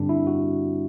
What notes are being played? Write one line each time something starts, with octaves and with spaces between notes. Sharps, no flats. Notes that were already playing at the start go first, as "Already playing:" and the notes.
Already playing: G2 D3 G3 C4 D4
E4
F#4